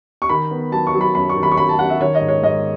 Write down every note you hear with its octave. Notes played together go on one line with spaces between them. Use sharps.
C#6
D#3 B5
B3
F#3 A5
C#6
F#3
B5
F#2 B5
C#6
D#3
B5
C#6
F#3 B5
A5
F#2 F#5
E5
D#3 C#5
D#5
G#2
C#5
G#2 D#5